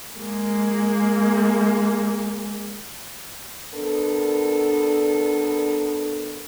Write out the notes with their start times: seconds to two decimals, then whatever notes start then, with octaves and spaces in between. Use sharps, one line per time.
0.18 G#3 A#3
3.74 B3 D4 A4 A#4